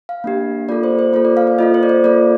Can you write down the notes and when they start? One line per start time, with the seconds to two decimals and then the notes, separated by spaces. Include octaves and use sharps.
0.09 F5
0.24 A#3 D4 G4
0.69 A#3 F4 A4 D5
0.84 C5
0.99 C5
1.13 A#3 F4 A4 C5
1.25 D5
1.37 F5
1.47 F5
1.59 A#3 F4 A4 D#5
1.74 C5
1.83 D5
1.89 C5
2.04 A#3 F4 A4 D5